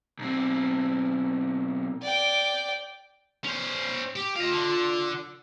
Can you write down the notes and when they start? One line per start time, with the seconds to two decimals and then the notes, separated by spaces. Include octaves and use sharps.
0.19 B1 C4
2.02 D5 G5
3.45 C#4 C5
4.16 G4
4.36 F4 D#5 F5
4.50 D3